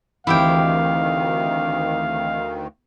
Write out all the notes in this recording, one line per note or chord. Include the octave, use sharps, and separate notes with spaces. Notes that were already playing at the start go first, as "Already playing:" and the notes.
D2 D#3 E3 C4 E4 G4 F5 G5